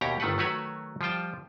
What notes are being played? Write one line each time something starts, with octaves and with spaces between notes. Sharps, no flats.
D#2 B2 G4 C#5 A#5
G1 D#3 A3 A4 B4 F#5
D#3 F#3 A3 F#4 B4 C#5
F3 G3 F4 G5 A5